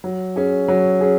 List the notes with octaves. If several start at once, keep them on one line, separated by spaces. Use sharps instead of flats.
F#3
C#4 G#4
F#3
C#4 G#4